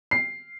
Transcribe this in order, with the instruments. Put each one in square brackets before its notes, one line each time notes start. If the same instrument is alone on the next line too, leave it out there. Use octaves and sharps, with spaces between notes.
[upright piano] C7